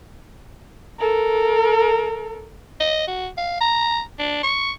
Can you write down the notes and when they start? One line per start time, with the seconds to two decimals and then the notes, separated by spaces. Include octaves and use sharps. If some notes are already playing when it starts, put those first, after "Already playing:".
0.99 A4 A#4
2.80 D#5
3.07 F#4
3.37 F5
3.60 A#5
4.19 D4
4.43 C#6